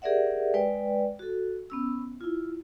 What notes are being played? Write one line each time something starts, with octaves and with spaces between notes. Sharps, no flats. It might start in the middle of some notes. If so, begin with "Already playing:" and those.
G4 G#4 A#4 D5 E5 F#5
G#3 B4 D5 G5
F#4 A4
B3 C#4 E6
E4 F4